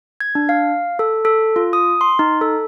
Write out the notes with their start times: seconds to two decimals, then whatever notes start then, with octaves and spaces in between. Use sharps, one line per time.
0.20 G#6
0.35 D4
0.49 F5
0.99 A4
1.25 A4
1.56 F4
1.73 D#6
2.01 C6
2.19 D#4
2.41 A4